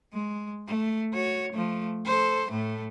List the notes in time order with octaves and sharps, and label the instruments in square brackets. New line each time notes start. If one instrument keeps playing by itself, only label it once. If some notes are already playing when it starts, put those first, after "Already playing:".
[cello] G#3
A3
F#4 C#5
F3 A3
A4 C5
A2 A3